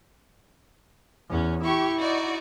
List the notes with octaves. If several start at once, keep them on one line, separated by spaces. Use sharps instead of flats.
E2 C#4
E4 G4 C#6
D#4 F#4 D5